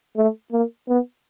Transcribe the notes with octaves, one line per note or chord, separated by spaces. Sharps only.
A3
A#3
B3